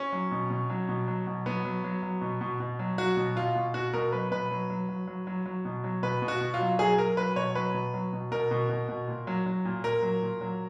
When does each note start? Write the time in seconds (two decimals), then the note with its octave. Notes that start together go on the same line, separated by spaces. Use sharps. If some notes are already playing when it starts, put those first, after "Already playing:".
Already playing: C#4
0.12 F#3
0.31 B2
0.50 B2
0.70 F#3
0.89 B2
1.08 F#3
1.27 B2
1.46 F#3 B3
1.65 F#3
1.84 F#3
2.03 F#3
2.22 B2
2.41 B2
2.60 B2
2.79 F#3
2.98 F#3 F#4
3.17 B2
3.36 B2 F4
3.55 B2
3.74 B2 F#4
3.93 B2 A#4
4.12 F#3 B4
4.31 B2 B4
4.51 F#3
4.70 F#3
4.89 F#3
5.07 F#3
5.27 F#3
5.46 F#3
5.65 B2
5.84 F#3
6.03 B2 B4
6.22 B2
6.28 F#4
6.41 B2
6.54 F4
6.60 F#3
6.79 F#3 G#4
6.98 F#3 A#4
7.17 F#3 B4
7.36 B2 C#5
7.55 F#3 B4
7.74 B2
7.94 F#3
8.13 B2
8.31 B2 A#4
8.51 B2
8.69 B2
8.89 B2
9.08 A#2
9.27 F#3
9.46 F#3
9.65 A#2
9.84 A#2 A#4
10.02 F#3
10.22 A#2
10.41 F#3